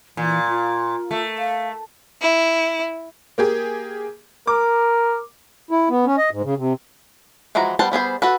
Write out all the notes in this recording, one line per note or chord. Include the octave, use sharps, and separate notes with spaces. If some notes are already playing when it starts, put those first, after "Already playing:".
A#2 E3
F4
A3
F5
E4
A#3 G4 G#4
A#4 D6
E4
B3
C#4
D#5
G#2
C#3
C3
E3 F3 G#3 F#4 A#5
G3 B3 C5 F#5 A5
G3 B3 G#4 C5
F#4 A4 B4